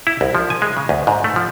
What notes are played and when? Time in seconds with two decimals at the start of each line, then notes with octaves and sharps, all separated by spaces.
0.07 E4
0.21 C2
0.35 F3
0.50 G#5
0.62 G#3
0.77 C#3
0.89 D2
1.07 G#2
1.24 A3
1.36 F3